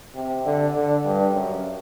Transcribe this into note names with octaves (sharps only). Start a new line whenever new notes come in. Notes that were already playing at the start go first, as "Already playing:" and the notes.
C3
D3
D3
G2
F#2